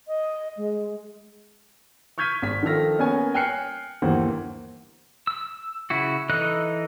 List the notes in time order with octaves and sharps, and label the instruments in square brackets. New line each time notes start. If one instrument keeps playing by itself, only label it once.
[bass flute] D#5
G#3
[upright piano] C#6 F6 G6 G#6 B6 D#7
G#1 B6
D#3 F3 A4 F6 A#6
A#3 B3 C#4 C#5 G#5
G5 G#5 F6 F#6 C7 C#7
G1 D#2 E3 A#3 C5 F#5
[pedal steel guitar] E6
C#3 E4 F#4
E3 D#4 A4 D#5 F#6